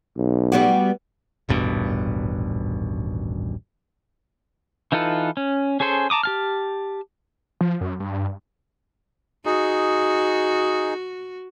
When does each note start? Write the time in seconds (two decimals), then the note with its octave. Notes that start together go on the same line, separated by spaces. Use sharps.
0.17 B1
0.52 G3 B3 F#4
1.49 D#1 A1 G2 B2
4.92 E3 D#4 F4 A4 B4
5.37 C#4
5.80 C#4 G#4 A4 C5 G#5
6.10 A5 A#5 D6 D#6
6.23 G4 A5 F6
7.61 F3
7.81 F#2
8.00 G2
9.46 D#4 F#4 G#4